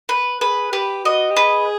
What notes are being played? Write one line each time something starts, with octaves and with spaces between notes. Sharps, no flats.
B4
G#4 B4
G4 B4
F#4 D#5
G4
G#4 B4